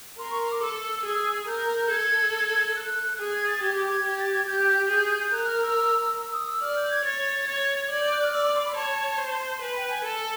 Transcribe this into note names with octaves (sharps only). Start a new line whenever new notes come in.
A#4 C6
C#6
C6
D6
A4 E6
G#4
A#4 G6
A4 G#6
F#6
G#4
G#6
A6
G4 G#6
D6
G#6
G4 G#6
A6
G#6
G4 G6
G#4
A#4 F#6
F#6
F6
E6
E6
D#6
E6
D5 F6
G6
G#6
C#5 A6
C#5
D5 G#6
G6
F#6
F6
D5 E6
D6
C6
B5
C#5 A5
C5
B4 G#5
G5
G#5
A4 A5